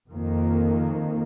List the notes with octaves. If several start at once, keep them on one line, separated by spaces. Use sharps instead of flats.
F2 D#3 A#3